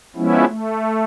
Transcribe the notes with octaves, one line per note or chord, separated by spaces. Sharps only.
F3 G#3 B3 C#4 E4
A3